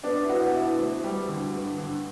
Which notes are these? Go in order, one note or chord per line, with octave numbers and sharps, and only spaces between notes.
B3 D4
E4
B3 F#4
B2 E4
D2
G3
D3
G2
D3